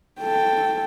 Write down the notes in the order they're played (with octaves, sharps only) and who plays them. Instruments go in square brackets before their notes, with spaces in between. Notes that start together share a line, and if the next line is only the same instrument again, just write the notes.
[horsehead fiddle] A4 G5